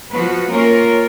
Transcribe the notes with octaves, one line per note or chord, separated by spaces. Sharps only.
F3 B3 F#4 B4
A#3 C#4 F4 A#4 C#5